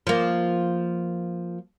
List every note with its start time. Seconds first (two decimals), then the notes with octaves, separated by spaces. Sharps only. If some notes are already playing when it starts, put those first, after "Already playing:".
0.07 F3 A#3